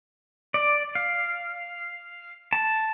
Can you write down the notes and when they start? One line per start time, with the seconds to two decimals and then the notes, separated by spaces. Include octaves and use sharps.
0.54 D5
0.95 F5
2.53 A5